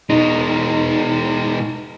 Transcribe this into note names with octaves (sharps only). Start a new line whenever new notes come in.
B2 G#3 D#4